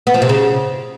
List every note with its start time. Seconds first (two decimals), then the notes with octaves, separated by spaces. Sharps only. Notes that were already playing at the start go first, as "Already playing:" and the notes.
0.07 B3
0.14 F3
0.22 C3
0.29 C#3